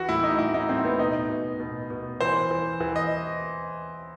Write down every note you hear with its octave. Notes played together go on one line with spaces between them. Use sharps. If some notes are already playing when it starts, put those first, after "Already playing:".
Already playing: E3 F#4
A2 E4
D#4
A2 E4
D#4
A2 C4
B3
B2 D#4
B2
B2
B2
E3 C5
E3
E3
D#5